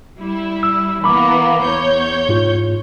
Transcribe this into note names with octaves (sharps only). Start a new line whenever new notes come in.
G3 E4
E6
E3 A#3 B3 B5 D6
E2 C#5 G6
G#2 F4